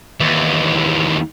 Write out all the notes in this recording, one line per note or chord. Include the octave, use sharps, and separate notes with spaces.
D#2 E3